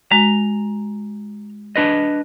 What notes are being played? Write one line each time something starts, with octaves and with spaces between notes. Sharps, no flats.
G#3 F#4 A#5
D4 B4 D#5